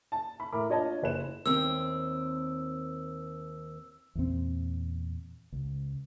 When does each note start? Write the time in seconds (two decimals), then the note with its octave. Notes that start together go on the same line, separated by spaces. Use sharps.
0.12 A5
0.40 B5
0.52 A2 A#4 B5 D6
0.69 D4 F4 C#5 D#5 A5
1.02 F#1 B4 E7
1.46 D#2 C4 E6
4.15 E2 A#2 C4
5.52 C#2